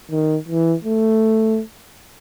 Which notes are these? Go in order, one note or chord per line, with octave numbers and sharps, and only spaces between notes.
D#3
E3
A3